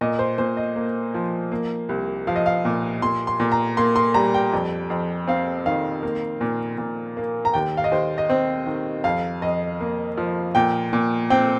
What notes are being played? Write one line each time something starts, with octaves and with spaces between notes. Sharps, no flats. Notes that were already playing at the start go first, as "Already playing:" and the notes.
A#2 D#5
C5
A#2 C5
D#5
A#3
F3
A#3
C2
F3 F5
D#5
F5
A#2
A#2 C6
C6
A#2
A#5
A#3 C6
C6
G3 A#5
G5
F2
F2
C4 F5
D#3 F5
A#3
A#2
A#2
A#3
A#5
D#2 G5
F5
D#5
D#2 C5
D#5
C4 C5
D#3
F2 F5
F2 D#5
A#3
F3
A#2 G5
A#2
C4 G5